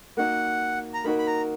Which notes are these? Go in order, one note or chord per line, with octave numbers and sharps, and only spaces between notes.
A#3 D#4 F#4 A#4 F#5
A#5
A#3 D#4 F#4 A#4 B5
B5
A#5